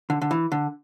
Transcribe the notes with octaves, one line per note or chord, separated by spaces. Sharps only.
D3
D3
E3
D3